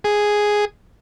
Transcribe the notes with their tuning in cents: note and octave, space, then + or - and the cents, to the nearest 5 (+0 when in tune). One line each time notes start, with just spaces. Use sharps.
G#4 +0